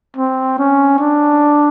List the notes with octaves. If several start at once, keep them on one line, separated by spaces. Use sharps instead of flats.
C4
C#4
D4